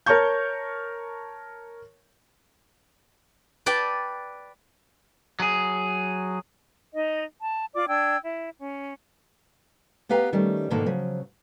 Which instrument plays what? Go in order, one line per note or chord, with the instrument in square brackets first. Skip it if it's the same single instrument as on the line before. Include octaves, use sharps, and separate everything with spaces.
[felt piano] A#4 C#5 A5 C#6 G6
[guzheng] B4 D5 G5 A5
[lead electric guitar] F#3 G#4
[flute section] D#4 D#5
A5
F4 D5 D6
D4 G5 E6 G#6
E4
C#4
[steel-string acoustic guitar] B3 G4 B4 F5 G5 A#5
D#3 G3 A3 C#4
G#2 B2 D3 D#3 A#3 A5
C#3 F3 F#3